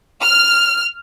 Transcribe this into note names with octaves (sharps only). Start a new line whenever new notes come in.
F6